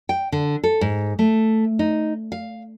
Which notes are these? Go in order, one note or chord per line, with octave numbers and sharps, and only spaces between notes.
G5
D3
A4
G#2
A3
D#4
F5